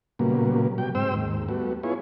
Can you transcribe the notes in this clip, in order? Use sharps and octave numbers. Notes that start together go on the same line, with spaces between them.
A#2 C#3 F#3 G3 A#3 B3
B2 F#3 G3 G5
G#2 C4 C5 G5 E6
D#2 G#2
G3 A3 B3 F#4
B3 E4 F4 G#4 C#5